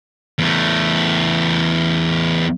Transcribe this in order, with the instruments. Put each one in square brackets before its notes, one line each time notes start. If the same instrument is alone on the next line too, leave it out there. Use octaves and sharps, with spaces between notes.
[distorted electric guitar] E2 A3